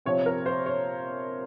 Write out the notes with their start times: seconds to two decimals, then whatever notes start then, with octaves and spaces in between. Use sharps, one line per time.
0.05 C3 F3 C4 C#5
0.26 A#4
0.46 C5
0.66 C#5